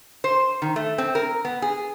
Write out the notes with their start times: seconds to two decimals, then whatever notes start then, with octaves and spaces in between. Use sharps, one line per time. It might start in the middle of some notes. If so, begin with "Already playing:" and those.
0.24 C5
0.62 D#3
0.76 A3
0.98 C4
1.15 A#4
1.45 B3
1.62 G#4